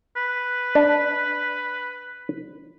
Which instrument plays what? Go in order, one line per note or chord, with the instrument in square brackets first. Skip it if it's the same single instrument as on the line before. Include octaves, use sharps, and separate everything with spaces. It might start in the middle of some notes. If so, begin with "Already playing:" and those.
[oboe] B4
[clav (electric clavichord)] D4